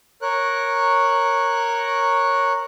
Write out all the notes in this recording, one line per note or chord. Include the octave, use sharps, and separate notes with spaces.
A#4 C#5 F#6